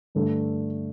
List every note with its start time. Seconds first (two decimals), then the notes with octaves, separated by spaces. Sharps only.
0.15 G2 D3 A3 D4 A4